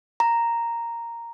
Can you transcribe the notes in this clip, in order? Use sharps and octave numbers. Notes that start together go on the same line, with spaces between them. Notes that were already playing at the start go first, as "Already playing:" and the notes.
A#5